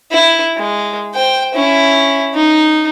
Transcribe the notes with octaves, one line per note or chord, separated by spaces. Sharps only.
E4
G#3
C5 G5
C#4 E4
D#4